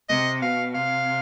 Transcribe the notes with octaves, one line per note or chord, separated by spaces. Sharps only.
C3 D#5
B2 F5
C3 F5